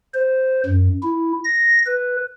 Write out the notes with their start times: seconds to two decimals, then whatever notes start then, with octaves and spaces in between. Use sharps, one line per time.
0.14 C5
0.66 F#2
1.03 E4
1.44 A#6
1.86 B4